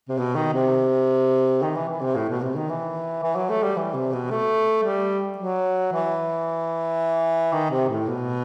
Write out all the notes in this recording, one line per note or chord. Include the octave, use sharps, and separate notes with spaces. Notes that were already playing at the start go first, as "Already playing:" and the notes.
C3
B2
D#3
C3
D#3
E3
E3
C3
A2
B2
C3
D#3
E3
E3
F#3
A3
G3
E3
C3
B2
A3
G3
F#3
E3
D#3
C3
A2
B2